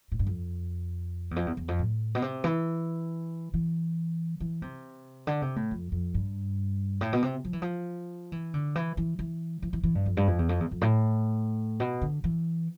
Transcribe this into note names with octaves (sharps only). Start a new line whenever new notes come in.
A2
G2
F2
E2
F2
E2
E2
F2
A2
B2
C3
E3
E3
E3
C3
D3
C3
A2
F2
F2
G2
A2
B2
C3
F3
E3
F3
E3
D3
E3
E3
E3
E3
E3
E3
G2
F2
G2
F2
E2
F2
E2
F2
A2
B2
D3
E3